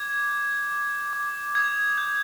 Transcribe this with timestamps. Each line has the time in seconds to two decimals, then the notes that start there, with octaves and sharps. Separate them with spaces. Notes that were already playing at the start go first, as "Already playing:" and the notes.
Already playing: D6 G#6
0.29 G6
0.72 D6
1.13 D6
1.55 D#6 G#6
1.98 G6